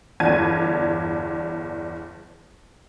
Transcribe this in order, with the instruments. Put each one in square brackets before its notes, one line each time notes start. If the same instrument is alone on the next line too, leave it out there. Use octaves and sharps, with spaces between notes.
[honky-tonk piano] G1 E2 D4 A5 G#6 D#7